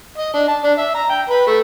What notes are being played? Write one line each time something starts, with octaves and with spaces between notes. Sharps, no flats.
D#5
D4
A5
D4
E5
A#5
G5
B4
A3